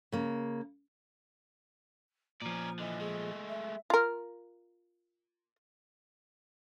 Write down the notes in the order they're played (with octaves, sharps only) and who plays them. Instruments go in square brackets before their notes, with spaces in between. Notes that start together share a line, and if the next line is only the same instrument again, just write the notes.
[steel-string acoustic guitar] C#3 A#3
[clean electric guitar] A#2 F3 [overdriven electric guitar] C#4 D5 [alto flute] A#5
[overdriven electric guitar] D3 E3 [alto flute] D#5
[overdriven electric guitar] G#3 A3 [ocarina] G#4
[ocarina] E5
[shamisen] F4 A#4